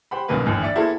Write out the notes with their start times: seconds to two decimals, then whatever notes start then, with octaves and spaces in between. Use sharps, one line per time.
0.11 G4 C5 F#5 B5
0.28 C2 F#2 B2 D#3 A#3 B4
0.46 G1 D#2 E3
0.62 D5 E5 C#7
0.75 A#3 E4 F#4 G#4 A4 C5